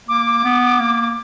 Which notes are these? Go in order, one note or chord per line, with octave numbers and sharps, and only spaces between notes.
A#3 D6
B3
A#3